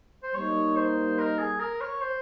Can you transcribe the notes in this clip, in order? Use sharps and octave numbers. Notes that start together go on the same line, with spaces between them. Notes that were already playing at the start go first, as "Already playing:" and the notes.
C5
G3 A#3 D#4 C#5
C5
A#4
G#4
A#4
C#5
C5